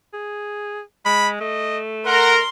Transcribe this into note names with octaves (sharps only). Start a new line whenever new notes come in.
G#4
G#3 B5
A3 D#5
A#4 F#5 C6